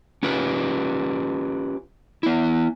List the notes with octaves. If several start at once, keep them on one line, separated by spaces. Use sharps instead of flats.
C#4 F4 G4 B4
B3 E4